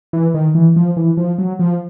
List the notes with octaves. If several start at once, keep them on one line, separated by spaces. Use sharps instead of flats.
E3
D#3
E3
F3
E3
F3
F#3
F3